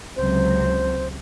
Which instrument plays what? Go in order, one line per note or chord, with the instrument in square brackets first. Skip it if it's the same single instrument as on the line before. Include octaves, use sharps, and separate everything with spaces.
[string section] C#2 C3 F#3 [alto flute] C5